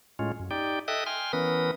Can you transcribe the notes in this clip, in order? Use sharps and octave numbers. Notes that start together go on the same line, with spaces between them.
A2 G#3 C#4 F4
F#2
D#4 G4 D5 G5
A4 D#5 E5 G5 D#6 F#6
G5 G#5 C6 F6
E3 B3 C#4 A#4 B4 D#6